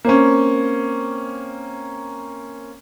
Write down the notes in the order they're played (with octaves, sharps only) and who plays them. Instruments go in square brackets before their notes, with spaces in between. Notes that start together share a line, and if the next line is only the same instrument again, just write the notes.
[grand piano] A#3 C4 C#4